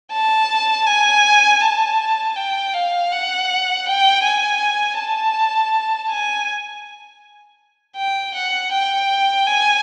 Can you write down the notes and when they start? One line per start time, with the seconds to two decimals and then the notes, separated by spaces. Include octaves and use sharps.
0.12 A5
0.86 G#5
1.61 A5
2.36 G5
2.74 F5
3.11 F#5
3.86 G5
4.23 G#5
4.98 A5
6.10 G#5
7.97 G5
8.35 F#5
8.72 G5
9.47 G#5